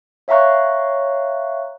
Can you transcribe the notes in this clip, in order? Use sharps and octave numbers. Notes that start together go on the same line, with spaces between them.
C#5 E5 F5 A#5 C#6 F#6